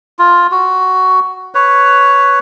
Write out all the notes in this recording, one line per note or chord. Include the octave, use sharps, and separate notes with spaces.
F4
F#4
B4 C#5